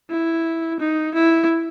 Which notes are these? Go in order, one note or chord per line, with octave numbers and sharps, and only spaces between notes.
E4
D#4
E4